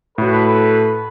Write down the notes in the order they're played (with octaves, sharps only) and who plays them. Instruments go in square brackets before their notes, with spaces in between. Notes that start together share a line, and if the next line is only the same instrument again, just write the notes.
[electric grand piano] A2 F#4 [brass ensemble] A4 B4